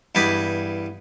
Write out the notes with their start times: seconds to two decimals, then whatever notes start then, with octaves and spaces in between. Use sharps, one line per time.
0.15 E2 G2 D5 D#5 B5